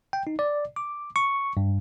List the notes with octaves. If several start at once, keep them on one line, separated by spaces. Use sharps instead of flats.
G5
D#4
D5
D6
C#6
G2